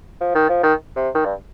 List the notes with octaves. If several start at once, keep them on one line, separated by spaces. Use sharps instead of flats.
F3
D#3
F3
D#3
C3
D#3
G2